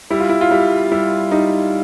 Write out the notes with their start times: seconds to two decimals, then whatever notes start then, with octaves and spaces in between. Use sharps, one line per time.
0.10 G3 E4
0.19 F4
0.29 E4
0.41 F4
0.51 G3 E4
0.92 G3 E4
1.32 G3 D#4